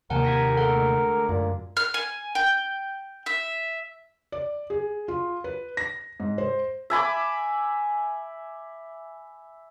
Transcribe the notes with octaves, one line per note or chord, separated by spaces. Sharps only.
D#2 C3 A#3 A#4 F#5 G#5 A5
D#3 G4 G#5 A#6
D3 G#3 A3 A4 F#5
F#2 A#2
F6
G#5
G5
E5
D5
G#4
F4
B4
A#6
G#2
C5
E5 G#5 B5 D6